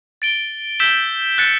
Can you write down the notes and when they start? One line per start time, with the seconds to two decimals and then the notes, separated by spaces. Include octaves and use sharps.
0.22 A6 D7 G7
0.80 E6 G6 B6 E7 G7
1.38 F#6 A6 C#7